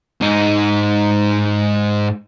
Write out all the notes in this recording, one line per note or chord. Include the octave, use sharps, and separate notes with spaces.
G#2 D#4